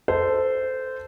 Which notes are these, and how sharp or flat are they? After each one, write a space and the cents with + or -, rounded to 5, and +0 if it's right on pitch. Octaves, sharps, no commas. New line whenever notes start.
A4 +5 C5 -15